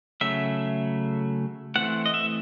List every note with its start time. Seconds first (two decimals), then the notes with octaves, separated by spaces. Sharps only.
0.21 C#3 F#3 A3 E5
1.75 E3 A3 C4 F#5
2.06 D#5
2.14 E5